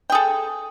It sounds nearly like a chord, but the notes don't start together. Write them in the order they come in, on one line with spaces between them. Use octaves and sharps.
G5 G#4 A4